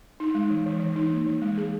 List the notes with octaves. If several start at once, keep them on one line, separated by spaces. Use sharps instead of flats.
D#4
G#3
E3
E3
E3
D#4
A#3
E3
G#3
G#4